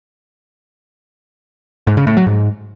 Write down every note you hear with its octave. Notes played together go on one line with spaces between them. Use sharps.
G#2
C#3
A2
F#3
G#2